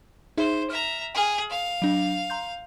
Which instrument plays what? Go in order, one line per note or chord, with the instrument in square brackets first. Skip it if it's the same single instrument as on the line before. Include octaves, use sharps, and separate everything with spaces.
[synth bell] D#4 G#4 E5 [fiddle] C5
[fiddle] E5 A#5 [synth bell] F6
[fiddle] G#4 [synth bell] G5 F6
[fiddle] F5
[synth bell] F#3 D4
A#5 C6 G6